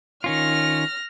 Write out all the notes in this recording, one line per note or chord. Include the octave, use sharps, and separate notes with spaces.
D#3 C#4 F4 F6 A#6